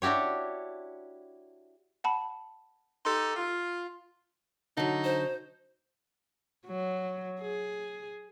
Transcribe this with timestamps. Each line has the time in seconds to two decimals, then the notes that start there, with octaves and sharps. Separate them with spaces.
0.02 D4 E4 F#4 G4 C#5
2.04 F#5 A5 B5
3.05 D#4 G4 A4 C6
3.36 F4
4.77 D3 F#3 D#4
5.04 C5
6.66 F#3
7.41 G#4